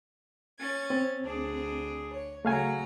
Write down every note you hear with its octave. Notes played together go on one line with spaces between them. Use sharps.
C#4 G#6 A6
C4
D2 D4 G#4
C#5
C#3 F#3 A3 F5 G#5 A#5